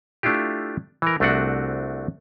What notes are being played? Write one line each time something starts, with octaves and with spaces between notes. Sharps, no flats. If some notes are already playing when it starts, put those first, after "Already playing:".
A3 D4 E4 F4 G4
E3 A#4
C2 A3 C4 D4 F#4 F#5